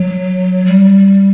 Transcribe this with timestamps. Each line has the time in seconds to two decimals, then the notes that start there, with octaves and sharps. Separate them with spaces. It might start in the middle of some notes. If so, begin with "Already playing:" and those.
Already playing: F#3
0.66 G3